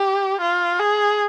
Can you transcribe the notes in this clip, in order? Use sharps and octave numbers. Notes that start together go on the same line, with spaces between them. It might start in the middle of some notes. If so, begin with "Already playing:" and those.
Already playing: G4
F4
G#4